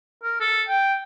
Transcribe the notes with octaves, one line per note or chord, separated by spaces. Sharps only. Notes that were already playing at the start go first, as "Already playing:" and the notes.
A#4
A4
G5